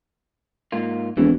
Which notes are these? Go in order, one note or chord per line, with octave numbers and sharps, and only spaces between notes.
G#2 A#3 F4
E1 F2 A2 E3